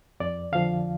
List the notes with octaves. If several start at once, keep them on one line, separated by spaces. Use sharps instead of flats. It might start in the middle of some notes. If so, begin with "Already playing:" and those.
F2 D5
D3 F3 F5